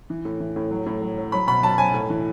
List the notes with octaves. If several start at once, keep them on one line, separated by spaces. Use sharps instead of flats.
E3
A2
E3
A2
F#3
A2
F#3
F#3
F#3 B5
B2 B5
F#3 A5
F#3 G#5
A2
E3